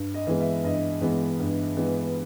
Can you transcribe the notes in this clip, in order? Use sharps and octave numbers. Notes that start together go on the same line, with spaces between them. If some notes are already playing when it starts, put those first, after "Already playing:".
Already playing: G2
D#5
E3 G#3 B3
E5
G2 D#5
E3 G#3 B3
G2
E3 G#3 B3